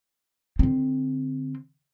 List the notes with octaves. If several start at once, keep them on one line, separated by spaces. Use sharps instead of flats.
D3 C4